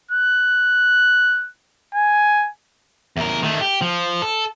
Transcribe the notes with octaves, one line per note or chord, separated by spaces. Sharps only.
F#6
G#5
E2 A#4
D#3 A3
G4
F3
A4